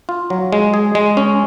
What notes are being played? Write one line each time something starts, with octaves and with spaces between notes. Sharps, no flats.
F4
F#3
G#3
G#4
G#3
C#4